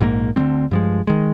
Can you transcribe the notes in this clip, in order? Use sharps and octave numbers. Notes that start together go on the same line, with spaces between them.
A#1 G#2 D#3 A#3
D2 D3 G3 C4
G2 F3 G#3
D#3 G#3